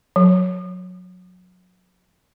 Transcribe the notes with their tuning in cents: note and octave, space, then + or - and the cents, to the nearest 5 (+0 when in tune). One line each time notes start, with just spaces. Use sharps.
F#3 -25